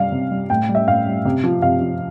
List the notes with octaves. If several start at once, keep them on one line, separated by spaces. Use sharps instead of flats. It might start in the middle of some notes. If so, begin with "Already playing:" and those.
Already playing: C3 G3 F5
C3
G3
A2 G5
G3
E5
A2 F5
G3
C3
F3
C3 F5
F3